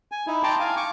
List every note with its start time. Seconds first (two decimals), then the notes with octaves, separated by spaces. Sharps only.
0.12 G#5
0.27 D#4 E4
0.43 G5 A5 A#5 C6 D6
0.60 F5 G#5
0.77 C#6 D6